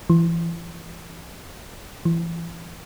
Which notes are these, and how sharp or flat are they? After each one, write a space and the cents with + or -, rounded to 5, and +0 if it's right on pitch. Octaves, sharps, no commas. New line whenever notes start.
E3 +30
E3 +30